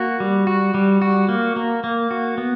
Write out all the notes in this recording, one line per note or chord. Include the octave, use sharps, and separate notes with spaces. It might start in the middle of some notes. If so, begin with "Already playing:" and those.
Already playing: A#3 F#4
G3
F#4
G3
F#4
A#3
A#3
A#3
F#4
B3